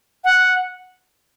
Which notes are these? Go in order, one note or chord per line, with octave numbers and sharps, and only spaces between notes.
F#5